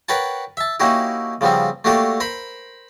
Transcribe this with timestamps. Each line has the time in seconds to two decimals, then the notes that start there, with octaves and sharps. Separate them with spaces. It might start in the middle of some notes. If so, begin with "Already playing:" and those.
0.09 A#4 B4 C#5 F#5 G5 A5
0.57 E5 A5
0.80 A#3 C#4 D#4 E4 F#4 G4
1.41 C#3 F3 G3 B3 C4
1.84 A3 A#3 D4 F#4 G4 A4
2.20 A#4 C5 B5